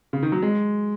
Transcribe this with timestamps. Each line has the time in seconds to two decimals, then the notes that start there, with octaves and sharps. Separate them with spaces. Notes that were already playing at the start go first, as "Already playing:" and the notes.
0.13 C#3
0.23 D#3
0.32 F#3
0.43 G#3